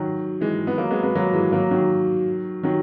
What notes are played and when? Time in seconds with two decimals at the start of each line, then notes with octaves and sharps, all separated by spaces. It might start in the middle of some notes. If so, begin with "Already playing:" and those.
Already playing: D#3 F#3
0.41 E3 G#3
0.67 B3
0.78 F#3 A#3
0.90 G#3 B3
1.03 G#3 B3
1.15 F#3 A#3
1.33 E3 G#3
1.52 F#3 A#3
1.71 D#3 F#3
2.63 D#3 F#3